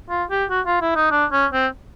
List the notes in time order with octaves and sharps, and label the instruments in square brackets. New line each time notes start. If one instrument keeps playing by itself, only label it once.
[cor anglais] F4
G4
F#4
F4
E4
D#4
D4
C#4
C4